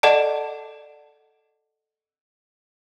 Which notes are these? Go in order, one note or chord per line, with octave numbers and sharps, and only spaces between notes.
A4 D5 D#5 F#5 A5